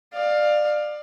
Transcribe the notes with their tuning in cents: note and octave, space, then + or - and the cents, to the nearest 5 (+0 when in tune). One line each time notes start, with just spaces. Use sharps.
D5 +25 F5 +10